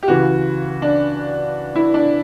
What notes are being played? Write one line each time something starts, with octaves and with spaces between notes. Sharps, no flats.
G4
C#2 C#3 E3 F#4
D4
E4
D4